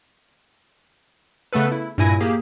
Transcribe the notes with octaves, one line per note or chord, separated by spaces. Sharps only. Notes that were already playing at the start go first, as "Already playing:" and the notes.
C#3 A3 B3 A4 B4
E4
G2 A#2 E4 G#5 A#6
A#3 G4 G#4